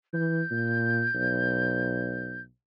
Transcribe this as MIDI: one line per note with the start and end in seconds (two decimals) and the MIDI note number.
0.13 0.42 52
0.13 2.41 91
0.51 1.07 46
1.14 2.47 35